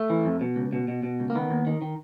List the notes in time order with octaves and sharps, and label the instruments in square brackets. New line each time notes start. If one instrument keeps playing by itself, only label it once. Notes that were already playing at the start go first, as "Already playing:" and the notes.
Already playing: [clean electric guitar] A3
E3
F2
B2
C#2
B2
B2
B2
C#2
A#3
D#3 B3
D#2
D#3
D#3